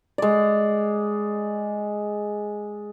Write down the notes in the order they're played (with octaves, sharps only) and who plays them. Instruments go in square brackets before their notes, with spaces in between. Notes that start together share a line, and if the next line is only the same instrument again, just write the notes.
[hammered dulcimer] G#3 D5